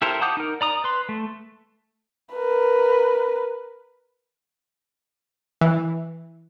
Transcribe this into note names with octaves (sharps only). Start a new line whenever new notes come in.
E4 G4 A4 A#4 C5
F#5 A5 D6 D#6 G6
D#4 A#4
D5 A#5 D#6
B4 C6
A3
A#4 B4
E3